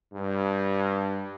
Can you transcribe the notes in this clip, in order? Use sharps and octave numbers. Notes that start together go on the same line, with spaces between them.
G2